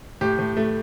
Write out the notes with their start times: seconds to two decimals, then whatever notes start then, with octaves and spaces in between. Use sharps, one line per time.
0.21 A2 G4
0.39 A2
0.57 A3